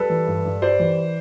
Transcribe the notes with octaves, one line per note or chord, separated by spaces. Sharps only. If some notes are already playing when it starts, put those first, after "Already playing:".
Already playing: G3 A4 B4
E3
G2
G2
G3 C5 D5
E3